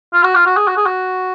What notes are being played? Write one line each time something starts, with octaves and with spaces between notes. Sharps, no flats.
F4
F#4
F4
F#4
G#4
F#4
G#4
F#4